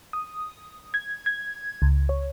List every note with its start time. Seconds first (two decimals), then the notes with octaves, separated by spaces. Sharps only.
0.13 D#6
0.94 G#6
1.26 G#6
1.82 C#2
2.09 C#5